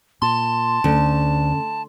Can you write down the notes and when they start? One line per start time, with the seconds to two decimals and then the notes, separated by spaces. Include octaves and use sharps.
0.22 A#2 A5 C6
0.84 D2 D3 C#4